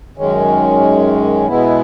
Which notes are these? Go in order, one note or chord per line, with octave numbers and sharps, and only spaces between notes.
F#2 D#3 G#3 C#4
B2 G#3 B3 E4